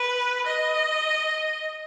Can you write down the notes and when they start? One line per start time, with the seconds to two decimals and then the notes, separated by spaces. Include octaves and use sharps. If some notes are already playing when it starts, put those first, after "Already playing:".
Already playing: B4
0.46 D#5